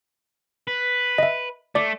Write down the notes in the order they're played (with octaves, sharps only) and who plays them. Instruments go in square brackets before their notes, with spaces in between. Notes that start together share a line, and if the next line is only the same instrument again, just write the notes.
[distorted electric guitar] B4
[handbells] D#5 E5
[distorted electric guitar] A3 [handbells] D5 D6